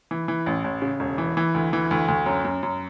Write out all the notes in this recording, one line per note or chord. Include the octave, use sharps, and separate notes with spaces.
E3
E3
A1
A1
C#3
E1
E3
E3
D2
E3
D2
D2
F#2
F#2
F#2